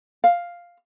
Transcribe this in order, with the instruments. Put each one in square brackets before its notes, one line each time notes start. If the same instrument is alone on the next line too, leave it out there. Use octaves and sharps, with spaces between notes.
[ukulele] F5